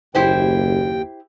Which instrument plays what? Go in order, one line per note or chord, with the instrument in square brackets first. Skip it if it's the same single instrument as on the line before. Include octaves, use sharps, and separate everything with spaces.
[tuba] F#1 [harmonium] D#2 G5 [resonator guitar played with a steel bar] E4 G4 C5